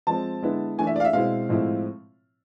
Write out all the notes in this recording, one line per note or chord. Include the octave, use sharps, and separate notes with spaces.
F3 G#3 C4 A5
D3 G#3 B3 E4
E3 A3 D4 G#5
E5
D5
F5
E5
B2 G#3 C4 E4 F5
A2 F3 G#3 C4 E4